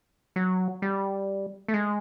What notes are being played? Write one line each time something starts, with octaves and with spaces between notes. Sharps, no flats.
F#3
G3
A3
G#3